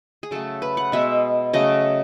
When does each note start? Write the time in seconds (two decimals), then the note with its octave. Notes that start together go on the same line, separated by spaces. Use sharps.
0.23 G#4
0.31 C#3 F#3 A3 A4
0.62 B4
0.77 F#5
0.92 B2 G#3 B3 E5
1.53 C#3 F#3 A3 D#5